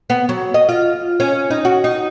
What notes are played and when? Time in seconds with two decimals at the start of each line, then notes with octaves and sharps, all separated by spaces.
0.10 B3
0.29 F#3
0.54 D#5
0.69 F4
1.20 C#4
1.50 D#4
1.65 F#4
1.84 D#4